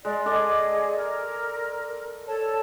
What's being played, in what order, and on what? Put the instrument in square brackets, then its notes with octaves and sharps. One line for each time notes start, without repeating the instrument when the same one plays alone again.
[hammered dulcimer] G#3 [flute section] D5
[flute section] G#4 D#5 [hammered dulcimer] A4 D5
[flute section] A#4
A4 C#5 A5